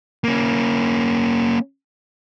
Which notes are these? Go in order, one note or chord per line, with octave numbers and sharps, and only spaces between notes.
A#3 C#4